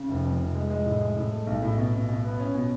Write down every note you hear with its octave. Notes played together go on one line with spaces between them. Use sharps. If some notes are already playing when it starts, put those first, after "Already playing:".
Already playing: C#3
F1
F2
F1
G#3
G#3
A2
G#3
A2
A3
B1
A2
B2
B2
B2
B3
C#4
B2